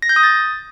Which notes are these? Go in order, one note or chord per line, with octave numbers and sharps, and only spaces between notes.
A#6
G6
D#6
A6